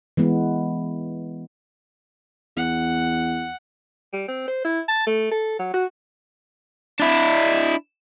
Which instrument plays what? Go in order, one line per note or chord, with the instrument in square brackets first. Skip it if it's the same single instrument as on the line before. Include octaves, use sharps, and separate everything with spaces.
[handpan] E3 G#3 B3
[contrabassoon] E2 [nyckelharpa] F#5
[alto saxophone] G3
C4
C5
E4
A5
A3
A4
F#3
F#4
[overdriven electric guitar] D4 E4